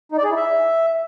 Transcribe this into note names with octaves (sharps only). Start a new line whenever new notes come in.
D#4
D5
G#4
E4
E5